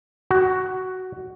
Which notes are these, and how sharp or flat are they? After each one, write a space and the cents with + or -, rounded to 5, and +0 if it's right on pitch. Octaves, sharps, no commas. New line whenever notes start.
F#4 +10